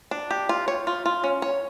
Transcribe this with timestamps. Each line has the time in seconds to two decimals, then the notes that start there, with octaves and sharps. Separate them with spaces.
0.11 D4
0.31 G4
0.49 F4
0.68 C#5
0.87 F4
1.06 F4
1.24 C#4
1.42 C#5